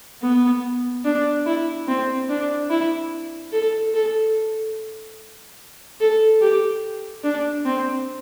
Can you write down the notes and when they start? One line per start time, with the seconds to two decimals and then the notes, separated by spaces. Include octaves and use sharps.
0.22 B3
1.05 D4
1.46 E4
1.88 C4
2.29 D4
2.70 E4
3.52 A4
3.94 A4
6.00 A4
6.41 G4
7.24 D4
7.65 C4